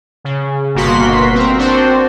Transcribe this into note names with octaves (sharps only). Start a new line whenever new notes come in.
C#3
G1 B2 A#3 F#4 C6 B6
C4 A#4
C4 D4 F#4 C5